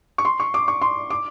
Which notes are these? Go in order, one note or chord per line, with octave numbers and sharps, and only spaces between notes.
C#6
C6
C#6
D6
C#6
C6
D6